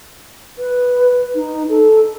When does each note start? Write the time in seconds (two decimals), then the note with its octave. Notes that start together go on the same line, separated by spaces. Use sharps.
0.58 B4
1.35 D#4
1.69 A4